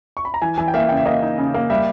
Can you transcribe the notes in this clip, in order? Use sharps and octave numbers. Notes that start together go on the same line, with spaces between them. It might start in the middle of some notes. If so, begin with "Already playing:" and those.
C#6
B5
A#5
E3 G#5
E3 G#5
G5
A#3 E5
C#3 G5
E5
A#3 D#5
D#4
C#3
A#3
G3 E5